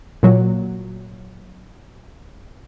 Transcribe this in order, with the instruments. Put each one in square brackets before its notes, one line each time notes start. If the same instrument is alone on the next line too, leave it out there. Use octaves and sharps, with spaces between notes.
[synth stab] A#2 F#3